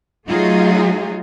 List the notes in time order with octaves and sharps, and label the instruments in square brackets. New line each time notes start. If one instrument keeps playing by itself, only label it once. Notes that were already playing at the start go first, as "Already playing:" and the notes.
[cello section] F#3 A3 D#4 F4 F#4 G#4